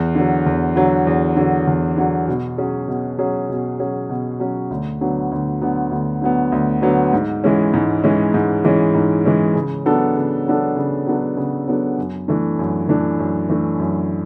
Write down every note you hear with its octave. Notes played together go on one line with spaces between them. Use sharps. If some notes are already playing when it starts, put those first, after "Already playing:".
Already playing: E2
D3 F#3
E2
D3 F#3
E2
D3 F#3
E2
D3 F#3
B2
F#3 C#4 G#4
B2
F#3 C#4 G#4
B2
F#3 C#4 G#4
B2
F#3 C#4 G#4
D2
D3 F#3 B3
D2
D3 F#3 B3
D2
D3 F#3 B3
D2
D3 F#3 B3
G#2
E3 G#3 C#4
G#2
E3 G#3 C#4
G#2
E3 G#3 C#4
G#2
E3 G#3 C#4
C#3
F#3 B3 D4 A4
C#3
F#3 B3 D4 A4
C#3
F#3 B3 D4 A4
C#3
F#3 B3 D4 A4
F#2
E3 A3 D4
F#2
E3 A3 D4
F#2
E3 A3 D4
F#2